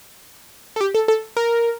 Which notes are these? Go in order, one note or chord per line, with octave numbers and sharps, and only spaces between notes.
A4
G4
A4
A4
A#4